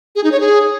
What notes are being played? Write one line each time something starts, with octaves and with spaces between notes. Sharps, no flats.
G#4
D#4
C#5
G#4